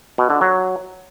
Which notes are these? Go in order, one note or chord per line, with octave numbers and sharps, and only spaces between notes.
B2
D3
F#3